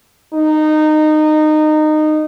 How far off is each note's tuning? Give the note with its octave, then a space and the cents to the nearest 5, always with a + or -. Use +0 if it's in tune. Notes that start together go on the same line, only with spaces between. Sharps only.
D#4 -20